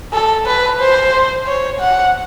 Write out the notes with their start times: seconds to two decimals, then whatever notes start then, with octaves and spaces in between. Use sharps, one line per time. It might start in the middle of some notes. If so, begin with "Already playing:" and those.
0.13 A4
0.47 B4
0.80 C5
1.46 C#5
1.80 F#5